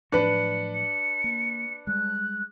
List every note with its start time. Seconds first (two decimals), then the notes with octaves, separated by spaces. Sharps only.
0.12 A2 F3 F#3 D4 B4 C#7
0.74 C#7
1.24 A#3
1.87 G3 G#3 F#6